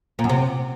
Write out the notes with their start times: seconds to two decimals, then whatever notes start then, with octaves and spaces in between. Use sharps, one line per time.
0.19 A#2
0.24 F#2
0.29 C3